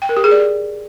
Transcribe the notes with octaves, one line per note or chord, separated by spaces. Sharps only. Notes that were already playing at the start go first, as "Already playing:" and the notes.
G5
A#4
G4
G#4
D5